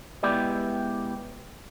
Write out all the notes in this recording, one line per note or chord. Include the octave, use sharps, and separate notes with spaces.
G#3 B3 E4 G4 D5